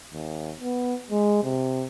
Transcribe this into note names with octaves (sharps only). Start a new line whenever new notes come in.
D#2
B3
G#3
C3